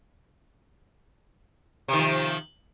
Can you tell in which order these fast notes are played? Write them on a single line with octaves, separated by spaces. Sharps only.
C3 D#3 F3